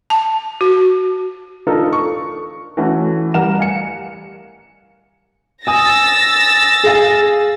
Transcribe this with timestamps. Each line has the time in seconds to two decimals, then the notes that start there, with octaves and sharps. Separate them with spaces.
0.10 A5
0.61 F#4
1.67 D4 D#4 F4 A4 A#4
1.93 C#6
2.77 E3 A3 C#4 F#4
3.34 G3 A#4 F#5 E7
3.59 F5 G#5 C#7
5.67 G#5 D#6 E6 A6 A#6
6.84 G#4 F5 G#5